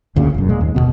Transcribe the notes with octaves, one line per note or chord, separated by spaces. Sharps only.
G1 D2 A#2 C#3
E1 F#2
A#2 G#3
D#2
F#1 G#2 B2 B3